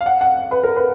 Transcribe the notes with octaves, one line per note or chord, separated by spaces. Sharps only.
F5
F#5
F#5
B4
A#4
B4